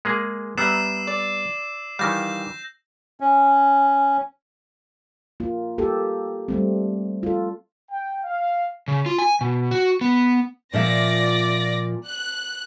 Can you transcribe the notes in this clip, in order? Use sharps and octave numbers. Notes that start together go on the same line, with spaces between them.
G#3 A#3 G#4
G3 B3 E5 A#5 E6 C7 E7
D5
D#3 E3 G3 F5 G6 A#6
C#4
A#3 F4
A#3 G4 A4
G3 A3 C4
F4 A4
G5
F5
C#3
F4
G#5
B2
F#4
B3
A#2 F3 D5 E5 A#6
F#6